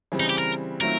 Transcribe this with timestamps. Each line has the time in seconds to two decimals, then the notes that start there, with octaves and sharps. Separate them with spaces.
0.12 C#3 E3 G3 C4
0.20 D#4
0.30 G4
0.38 A#4
0.81 D#3 F#3 A3 C4 F4 A#4